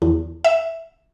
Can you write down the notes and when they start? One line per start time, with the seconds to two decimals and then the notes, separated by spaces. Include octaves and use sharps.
0.02 E2
0.44 E5